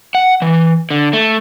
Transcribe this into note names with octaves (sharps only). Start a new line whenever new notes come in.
F#5
E3
D3
A3